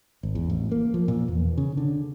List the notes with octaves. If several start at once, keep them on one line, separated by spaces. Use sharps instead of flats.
G#1
E2
A1
A#3
F3
A#2
E2
C#3
D3